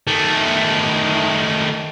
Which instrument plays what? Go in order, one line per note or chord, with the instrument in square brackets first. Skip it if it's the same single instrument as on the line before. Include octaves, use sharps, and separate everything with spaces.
[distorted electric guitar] D#3 A3